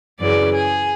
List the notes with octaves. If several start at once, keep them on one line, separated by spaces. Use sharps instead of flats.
F#2 C#3 E3 D5
G#4